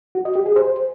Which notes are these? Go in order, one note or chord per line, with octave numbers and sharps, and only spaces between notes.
F#4
D#5
G4
G#4
C5